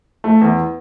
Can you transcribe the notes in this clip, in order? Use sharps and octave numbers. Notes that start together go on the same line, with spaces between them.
A3
E2